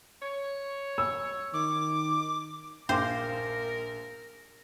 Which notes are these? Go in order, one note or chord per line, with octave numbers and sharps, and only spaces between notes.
C#5
E6
D#3 D6
A#1 A#4 C5 F5 G5 C6 D6